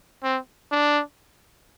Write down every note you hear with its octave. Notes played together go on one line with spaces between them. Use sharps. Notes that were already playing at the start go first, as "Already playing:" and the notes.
C4
D4